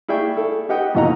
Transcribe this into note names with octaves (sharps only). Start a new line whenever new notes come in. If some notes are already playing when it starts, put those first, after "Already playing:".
E4 G#4 D5 G5 C#6
A4
G4 B4 D#5 F#5 G5 D#6
F2 B2 E3 D#5 F#5 A#5